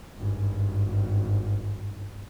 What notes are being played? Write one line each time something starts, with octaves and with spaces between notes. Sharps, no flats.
G#1 G2